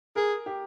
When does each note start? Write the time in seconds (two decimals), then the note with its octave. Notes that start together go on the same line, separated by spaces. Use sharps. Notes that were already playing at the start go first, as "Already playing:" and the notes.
0.16 G#4 A#4
0.46 G4